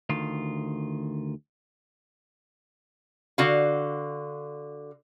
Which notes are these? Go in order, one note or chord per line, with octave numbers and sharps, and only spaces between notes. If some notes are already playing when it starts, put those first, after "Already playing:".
D2 D#3 F4
D3 F#4 F5